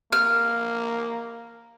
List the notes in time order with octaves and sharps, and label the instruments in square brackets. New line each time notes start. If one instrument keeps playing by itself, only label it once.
[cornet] A#3 [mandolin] F6